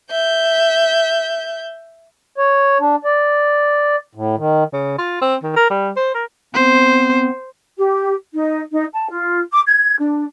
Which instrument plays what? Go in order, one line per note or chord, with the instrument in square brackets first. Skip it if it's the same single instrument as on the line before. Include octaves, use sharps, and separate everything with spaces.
[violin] E5 G6
[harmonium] C#5
D4
D5
A2
D#3
[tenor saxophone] C#3
F4
C4
D#3
A#4
G3
C5
A#4
[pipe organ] B3 C4 [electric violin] C5
[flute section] G4
D#4
D#4
A5
F4
D6
G#6
D4